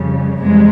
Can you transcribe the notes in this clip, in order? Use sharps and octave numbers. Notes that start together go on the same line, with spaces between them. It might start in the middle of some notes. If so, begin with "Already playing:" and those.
Already playing: F2 C#3 G3
F2 C3 E3 G3 G#3